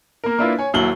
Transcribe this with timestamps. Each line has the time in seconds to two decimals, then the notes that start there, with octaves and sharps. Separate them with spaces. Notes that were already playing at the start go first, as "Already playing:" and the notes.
0.24 A#3 A#4
0.39 A#3 D4 E4 F4 B4
0.59 C#5 G#5
0.73 D#1 D#2 F#3 E4 F#7 G7